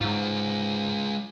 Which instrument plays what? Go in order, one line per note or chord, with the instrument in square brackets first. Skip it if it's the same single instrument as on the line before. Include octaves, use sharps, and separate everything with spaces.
[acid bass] G#2 [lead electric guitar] G#3 F4